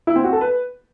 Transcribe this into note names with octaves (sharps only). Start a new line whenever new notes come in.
E4
C4
F#4
A4
B4